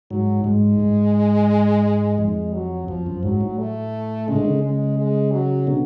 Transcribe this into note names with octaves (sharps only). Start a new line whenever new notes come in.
G#2 F#3
G#2 G#3
G#2
F2 G#3
F#3
F2 F3
F#2
G#2 F#3
A2
A3
C#3 G#3
D3
C#3
G#3
G#3
F#3
B2 D3